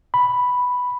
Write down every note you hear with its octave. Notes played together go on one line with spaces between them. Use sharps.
B5